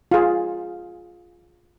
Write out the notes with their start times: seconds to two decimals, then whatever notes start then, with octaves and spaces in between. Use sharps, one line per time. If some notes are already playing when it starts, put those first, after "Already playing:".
0.11 F4 G#4